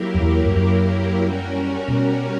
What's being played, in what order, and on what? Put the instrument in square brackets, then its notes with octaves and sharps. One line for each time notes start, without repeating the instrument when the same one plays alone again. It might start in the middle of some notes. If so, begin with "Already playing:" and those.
Already playing: [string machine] F#3 A#3 E4 G4 A#4
[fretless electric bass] F#2
E2
G2
F#2
[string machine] G3 C#4 F#4 A#4
[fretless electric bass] B2